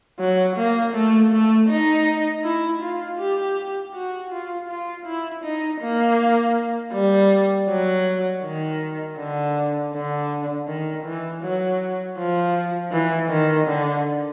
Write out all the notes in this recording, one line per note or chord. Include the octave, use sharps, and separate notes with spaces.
F#3
A#3
A3
A3
D#4
E4
F4
G4
F#4
F4
F4
E4
D#4
A#3
G3
F#3
D#3
D3
D3
D#3
E3
F#3
F3
E3
D#3
D3